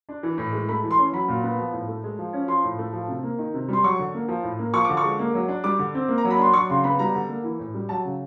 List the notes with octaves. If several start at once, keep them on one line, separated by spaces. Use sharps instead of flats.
D4
E3
A2
G#3
A3 B5
E3
C6
C#4
F#3 B5
A#2
B3
F3
A2
A3
G#3
F3
C#4
F3 C6
A2
A3
F3
C3
A#3
D#3
C3
G3 C6
F#3 C#6
D3
A#3
F3
A2
A#3
F3 C#6
D3 D6
C#6
G#3
A#3
F#3
D4
G3 D6
D3
C4
A#3
A#5
F#3
B5
D4 C6
F#3 C#6
C#3 C6
B3 B5
G3 A#5
D3
A#3
E3
A2
G3
F#3 A5
C#3